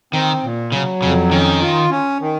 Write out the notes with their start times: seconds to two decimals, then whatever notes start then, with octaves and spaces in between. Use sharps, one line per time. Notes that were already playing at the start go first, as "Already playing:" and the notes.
0.13 D#3 C4
0.43 A#2
0.72 C#3 F#3
1.02 F2 C#3
1.31 D#3 C#4
1.61 F4
1.91 C#4
2.21 D#3